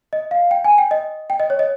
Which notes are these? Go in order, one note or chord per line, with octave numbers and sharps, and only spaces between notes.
D#5
F5
G5
G#5
G5
D#5
G5
D#5
C#5
D#5